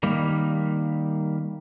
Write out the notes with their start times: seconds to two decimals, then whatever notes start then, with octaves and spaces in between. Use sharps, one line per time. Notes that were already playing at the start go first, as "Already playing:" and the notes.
0.03 D#3 G3 A#3